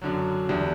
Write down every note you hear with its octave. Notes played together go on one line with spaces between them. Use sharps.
F#2 D3 F#3
E2 D3 G3